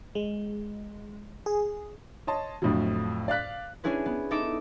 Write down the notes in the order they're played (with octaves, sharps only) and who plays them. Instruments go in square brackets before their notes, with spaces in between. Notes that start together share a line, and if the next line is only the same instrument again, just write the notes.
[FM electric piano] G#3
G#4
[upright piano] C#5 D#5 A5 C6
F2 A2 D3 F3 F#3
D5 F5 F#6 B6
[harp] C#4 D4 E4 G#4 B4
B3
D#4 A4 E5 D6 D7